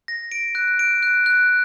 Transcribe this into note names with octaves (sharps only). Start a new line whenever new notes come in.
A#6
D7
F#6
D7
F#6
F#6